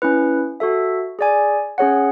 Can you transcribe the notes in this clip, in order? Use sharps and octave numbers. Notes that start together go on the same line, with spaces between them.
C#4 E4 B4
F#4 A4 E5
G#4 D5 G#5
C#4 G#4 C#5 F#5